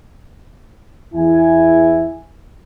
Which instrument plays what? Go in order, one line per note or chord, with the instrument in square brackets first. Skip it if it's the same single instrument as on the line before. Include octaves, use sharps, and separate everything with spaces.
[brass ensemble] E2 E4 G#5